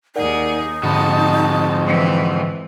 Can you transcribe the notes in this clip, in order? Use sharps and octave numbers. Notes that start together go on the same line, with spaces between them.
D#2 D#4 G#4 A#4 D5 F#5
F2 G#2 D3 G#3 F#4 A5 B5
E3 C4